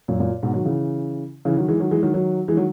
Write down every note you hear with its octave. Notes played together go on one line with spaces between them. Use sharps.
F#2 A#2
F#2 A#2
G#2 B2
D#3 F#3
C#3 E3
C#3 E3
D#3 F#3
E3 G#3
D#3 F#3
E3 G#3
D#3 F#3
D#3 F#3
E3 G#3
D#3 F#3